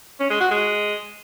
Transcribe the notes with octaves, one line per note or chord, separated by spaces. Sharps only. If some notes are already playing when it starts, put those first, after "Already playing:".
C#4
G#3
F#4
G#3